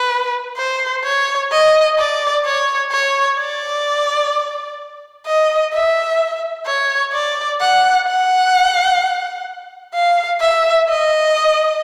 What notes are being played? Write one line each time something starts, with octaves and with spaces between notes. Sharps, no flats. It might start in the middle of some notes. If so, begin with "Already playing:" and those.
Already playing: B4
C5
C#5
D#5
D5
C#5
C#5
D5
D#5
E5
C#5
D5
F#5
F#5
F5
E5
D#5